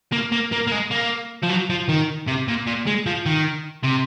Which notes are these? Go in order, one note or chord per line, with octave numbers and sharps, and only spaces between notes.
A#3
A#3
A#3
A#3
G#3
A#3
F3
F#3
F3
D#3
C3
A#2
A#2
G#3
F3
D#3
C3